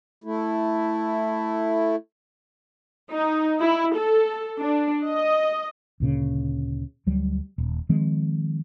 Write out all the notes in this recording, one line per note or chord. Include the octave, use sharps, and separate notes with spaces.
A3 E4
D#4
E4
A4
D4
D#5
D2 A#2 C#3
D2 F#3 G3
D#1
D#3 F3 G#3 C4